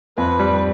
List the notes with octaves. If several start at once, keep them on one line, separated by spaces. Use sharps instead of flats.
F2 B4
G3